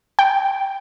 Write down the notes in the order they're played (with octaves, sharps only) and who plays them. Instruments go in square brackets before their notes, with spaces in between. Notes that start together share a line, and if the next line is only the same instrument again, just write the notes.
[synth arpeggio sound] G5